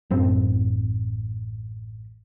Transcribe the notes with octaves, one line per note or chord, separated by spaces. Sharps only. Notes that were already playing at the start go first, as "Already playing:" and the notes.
A1 F#2 C4